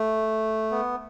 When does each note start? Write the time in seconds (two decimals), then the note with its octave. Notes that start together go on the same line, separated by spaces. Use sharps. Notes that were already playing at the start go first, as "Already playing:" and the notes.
Already playing: A3
0.71 B3